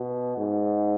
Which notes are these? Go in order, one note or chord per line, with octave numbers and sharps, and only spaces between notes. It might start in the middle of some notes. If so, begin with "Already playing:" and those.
Already playing: B2
G#2